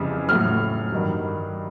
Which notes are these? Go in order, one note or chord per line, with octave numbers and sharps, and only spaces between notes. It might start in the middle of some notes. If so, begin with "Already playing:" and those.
Already playing: F2 C#3 E3 G3
A2 F#3 F6
G2 D#3 F#3